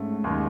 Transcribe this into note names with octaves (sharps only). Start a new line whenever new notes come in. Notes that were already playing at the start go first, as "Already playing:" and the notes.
Already playing: G#2 A3 C#4
D#2 D#3 G#3